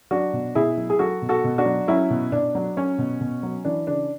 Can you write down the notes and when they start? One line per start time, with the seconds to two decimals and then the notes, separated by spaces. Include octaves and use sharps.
0.11 F#3 D4 F#4
0.33 B2
0.55 B2 E4 G#4
0.78 F#3
0.90 G#4
0.99 F#3 F#4 A4
1.22 B2
1.29 F#4 A4
1.44 B2
1.58 D4 F#4
1.66 F#3
1.88 F#3 C#4 E4
2.10 B2
2.32 B2 D4
2.55 F#3
2.77 F#3 C#4
2.98 B2
3.21 B2
3.43 F#3
3.65 E3 D4
3.87 C#3 D4